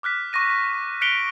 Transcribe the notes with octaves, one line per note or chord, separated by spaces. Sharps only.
D6 F6 F#6 B6
C#6 D6 A#6 D#7
C#6
F#6 B6 C#7 D7 F7 G7